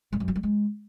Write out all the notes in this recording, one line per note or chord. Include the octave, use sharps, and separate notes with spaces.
G2
F#2
F#3
G3
G#3